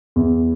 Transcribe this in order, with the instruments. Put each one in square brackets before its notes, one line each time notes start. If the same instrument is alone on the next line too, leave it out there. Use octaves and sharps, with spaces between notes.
[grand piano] E2